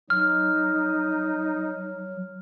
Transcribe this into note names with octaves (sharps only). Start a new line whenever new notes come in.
F#3 D#4 F6